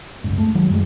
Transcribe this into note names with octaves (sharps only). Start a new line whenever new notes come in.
G1 C#2 G#2
A3
G2 D#3 F#3 G#3
F#2 G3 G#3